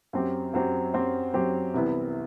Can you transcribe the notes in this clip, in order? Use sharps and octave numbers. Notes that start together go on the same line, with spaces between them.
F#2 F#3 C4 G4 C5
F#2 F#3 C4 G4 C5
F#2 F#3 C4 G4 C5
F#2 F#3 C4 G4 C5
C2 C3 E3 B3 E4